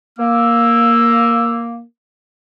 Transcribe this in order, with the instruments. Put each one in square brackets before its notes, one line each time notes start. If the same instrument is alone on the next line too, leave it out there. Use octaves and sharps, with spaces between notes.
[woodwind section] A#3 [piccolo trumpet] E6